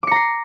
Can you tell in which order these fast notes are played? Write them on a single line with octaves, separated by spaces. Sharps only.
D6 C#7 A#5 C7